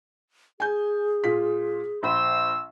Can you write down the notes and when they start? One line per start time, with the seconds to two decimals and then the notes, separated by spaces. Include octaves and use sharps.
0.60 G#4 G#5 G6
1.24 A#2 F4 B6
2.03 A#1 C5 B5 E6